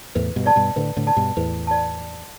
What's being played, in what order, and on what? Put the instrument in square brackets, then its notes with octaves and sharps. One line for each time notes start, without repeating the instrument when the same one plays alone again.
[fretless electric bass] E2 A2 [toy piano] B4
[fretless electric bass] G2 B2
[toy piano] D5 A5
[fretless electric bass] G2 B2
[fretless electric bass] A2 D3 [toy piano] B4
[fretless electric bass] A2 D3
[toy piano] D5 A5
[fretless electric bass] G2 B2
[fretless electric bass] E2 A2 [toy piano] B4
[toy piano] D5 A5